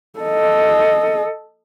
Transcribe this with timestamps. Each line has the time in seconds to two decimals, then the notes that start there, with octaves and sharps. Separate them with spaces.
0.20 A4 D#5